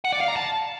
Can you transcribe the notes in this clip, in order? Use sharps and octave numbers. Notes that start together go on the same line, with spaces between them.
F#5
D5
F5
A#5
A5